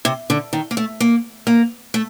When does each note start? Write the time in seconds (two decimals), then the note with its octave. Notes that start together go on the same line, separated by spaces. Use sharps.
0.05 C3
0.30 D3
0.53 D#3
0.71 A#3
0.77 A3
1.00 A#3
1.47 A#3
1.94 A3